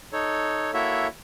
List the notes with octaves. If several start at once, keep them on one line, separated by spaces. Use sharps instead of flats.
D#4 A4 C#5
A#3 E4 F#4 A4 C#5 E5